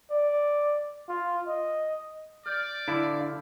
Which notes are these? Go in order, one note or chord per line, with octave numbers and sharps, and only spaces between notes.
D5
F4
D#5
D5 F6 G6
D3 D4 E4 F5